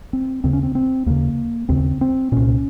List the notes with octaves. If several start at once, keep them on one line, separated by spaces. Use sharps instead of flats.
C4
D#2 C#3 C4
C#4
C4
C4
D#2 C#3 A#3
D#2 C#3 C4
C4
C2 A#2 C#4